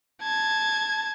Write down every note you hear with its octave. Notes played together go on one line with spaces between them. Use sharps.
A5 G#6